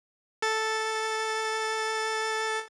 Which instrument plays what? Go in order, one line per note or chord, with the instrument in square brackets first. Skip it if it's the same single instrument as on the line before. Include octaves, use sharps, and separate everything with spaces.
[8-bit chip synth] A4 A6